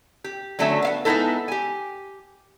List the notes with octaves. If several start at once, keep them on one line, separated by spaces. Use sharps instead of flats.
G4
D3 F#3 A3 C#4 F#4 E5
B3 F5 F#5
G#3 B3 C4 D#4 E4 A4
G4 G#5